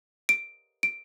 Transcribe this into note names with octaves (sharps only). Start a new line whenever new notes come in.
D7
D7